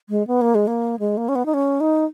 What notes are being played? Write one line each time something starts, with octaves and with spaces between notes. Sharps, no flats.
G#3
B3
A#3
G#3
A#3
G#3
A#3
C#4
B3
D#4
C#4
D#4